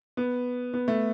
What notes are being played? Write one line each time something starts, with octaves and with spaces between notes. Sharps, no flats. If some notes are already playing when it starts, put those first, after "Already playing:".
B3
B3
A3